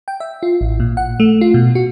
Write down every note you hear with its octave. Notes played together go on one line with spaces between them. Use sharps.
G5
E5
F4
A1
A#2
F#5
A3
F4
B2
F#4